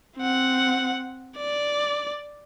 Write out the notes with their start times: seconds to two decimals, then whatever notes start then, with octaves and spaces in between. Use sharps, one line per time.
0.17 C4 F#5
1.38 D5